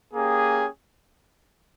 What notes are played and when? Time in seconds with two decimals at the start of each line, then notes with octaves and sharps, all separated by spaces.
0.14 A#3 C#4 G4 G#4